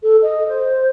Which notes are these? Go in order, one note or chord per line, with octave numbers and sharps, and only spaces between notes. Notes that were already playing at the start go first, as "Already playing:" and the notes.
A4
D#5
C5